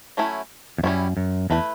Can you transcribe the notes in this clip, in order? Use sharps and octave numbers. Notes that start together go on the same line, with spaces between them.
F#3 A3 C#4 E4
E2
F#2 G3 C#4 E4
F#2
E2 A3 E4 B4